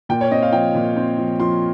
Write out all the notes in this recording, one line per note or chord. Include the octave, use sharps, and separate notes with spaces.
A#2 G5
C#5
C4 D#5
F5
F3 G5
A#2
C4
F3
F3 C6